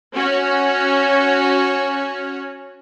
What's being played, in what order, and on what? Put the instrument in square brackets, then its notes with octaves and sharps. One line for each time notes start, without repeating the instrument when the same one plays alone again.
[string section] C#4 F#4 C#5